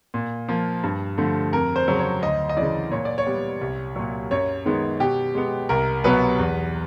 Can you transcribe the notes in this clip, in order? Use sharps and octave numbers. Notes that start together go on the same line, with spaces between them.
A#2
F3 A#3
G2
D3 F3 A3
F2 A#4
C5
C#3 F#3
C#5
D2 D#5
D#5
C#3 E3 D5
A#2 C#5
D5
C#5
G3 B3
C2
A#2 F#3
F#2 C#5
D#3 G#3 B3
B2 G4
G#3 B3
C2 A#4
B2 F#3 B3 B4
E2